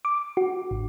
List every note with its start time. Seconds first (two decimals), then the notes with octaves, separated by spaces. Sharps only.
0.05 D6
0.37 F#4
0.71 G#1